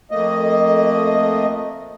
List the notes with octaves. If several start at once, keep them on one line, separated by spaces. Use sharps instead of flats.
F2 A3 A#3 D#5